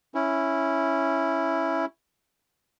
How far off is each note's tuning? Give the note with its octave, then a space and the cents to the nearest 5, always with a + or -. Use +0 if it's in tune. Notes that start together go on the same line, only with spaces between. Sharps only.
C#4 -5 E4 +0